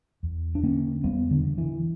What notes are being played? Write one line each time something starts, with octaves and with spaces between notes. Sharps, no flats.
E2
D4
D3 A#3 C#4
E2 G3 B3
D3
D3
E3